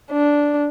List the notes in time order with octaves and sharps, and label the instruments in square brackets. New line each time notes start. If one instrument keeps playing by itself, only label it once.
[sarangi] D4